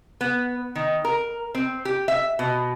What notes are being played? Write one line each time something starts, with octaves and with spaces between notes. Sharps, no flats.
B3
D#3
A#4
C4
G4
E5
B2